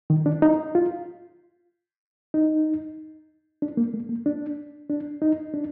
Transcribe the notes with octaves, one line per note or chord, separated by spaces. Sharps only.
D#3
D4
D#4
F4
D#4
D4
A#3
A3
A#3
D4
D4
D#4
D4